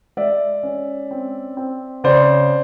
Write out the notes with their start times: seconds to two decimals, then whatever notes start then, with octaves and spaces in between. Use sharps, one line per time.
0.17 G#3 D5 E5
0.63 C#4
1.11 C4
1.57 C4
2.04 C#3 C5 D5